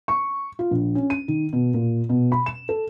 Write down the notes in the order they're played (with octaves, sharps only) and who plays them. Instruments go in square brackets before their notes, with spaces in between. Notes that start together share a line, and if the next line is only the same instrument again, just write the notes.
[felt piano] C#6
F4
A#1
C#4
D#7
D#3
B2
A#2
B2
B5
E7
A4